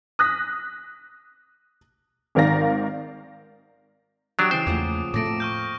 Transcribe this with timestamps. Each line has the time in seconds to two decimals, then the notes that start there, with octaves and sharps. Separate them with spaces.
0.19 D#6 F#6 A#6 B6
2.35 G#1 D#3 A#4 D5 F5 A#6
4.39 F#3 G3 D4 G4 D#5 D#6 D7
4.51 C#3 E3 C5 G#5
4.67 E2 F3 A3 A#3 F#5 D6
5.14 A2 A3 C4 A4 D6 A#6 D7
5.26 A#3
5.40 C#6 F6 G6